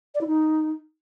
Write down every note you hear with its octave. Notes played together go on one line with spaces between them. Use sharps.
D5
E4
D#4